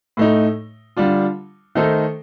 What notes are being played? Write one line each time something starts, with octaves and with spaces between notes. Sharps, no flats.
A2 A3 D#4
D3 G3 D4 F4
D#3 A3 D#4 A4 C5